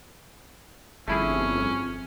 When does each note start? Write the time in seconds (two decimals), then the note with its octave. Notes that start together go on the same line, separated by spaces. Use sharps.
1.08 G1 F2 A3 C#4 E4 G#4